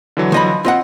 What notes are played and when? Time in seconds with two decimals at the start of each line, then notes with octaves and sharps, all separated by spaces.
0.17 D3 E3 F#3
0.32 F3 D#5 B5
0.65 C4 F4 D#5 F#5